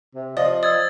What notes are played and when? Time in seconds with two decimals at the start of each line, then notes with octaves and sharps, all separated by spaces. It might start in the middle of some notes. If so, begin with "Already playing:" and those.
0.15 C3
0.37 F3 D5 D#5
0.63 D#6 E6 G#6 A6